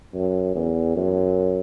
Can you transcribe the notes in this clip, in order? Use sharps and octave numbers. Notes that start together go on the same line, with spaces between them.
F#2
E2
F#2